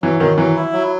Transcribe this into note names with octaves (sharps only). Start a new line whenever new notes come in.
E3 F#3
D#3 F#3
E3 F#3
E4
F#3